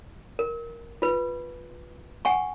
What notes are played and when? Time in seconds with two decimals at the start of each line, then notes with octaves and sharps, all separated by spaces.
0.39 A#4
1.02 F4 B4
2.25 F#5 G#5 C#6